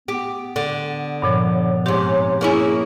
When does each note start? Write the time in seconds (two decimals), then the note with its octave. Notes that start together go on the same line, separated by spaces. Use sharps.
0.08 B3 G4
0.56 D3
1.22 G2 A#2 F3 C#5
1.86 G#2 C3 G4 C#5
2.41 A#3 C#4 E4 G#4